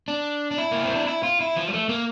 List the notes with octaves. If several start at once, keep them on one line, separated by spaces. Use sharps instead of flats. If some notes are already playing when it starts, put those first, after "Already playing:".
D4
D4
E4
A#3
C4
D4
E4
F4
E4
F3
G3
A3
A#3